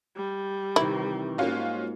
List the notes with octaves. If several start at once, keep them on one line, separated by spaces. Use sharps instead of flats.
G3
C3 D#3 E3 E4
G#2 A#3 C#4 F4 F#4